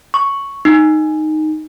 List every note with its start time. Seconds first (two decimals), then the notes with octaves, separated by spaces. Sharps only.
0.14 C#6
0.65 D#4